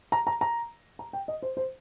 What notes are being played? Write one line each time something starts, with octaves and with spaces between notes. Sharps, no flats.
A#5
A#5
A#5
A#5
G5
D#5
C5
C5